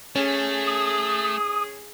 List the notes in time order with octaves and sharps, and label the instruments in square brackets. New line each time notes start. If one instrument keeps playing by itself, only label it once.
[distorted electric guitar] A3 [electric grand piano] C#4 [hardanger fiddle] G#4
[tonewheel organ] D#6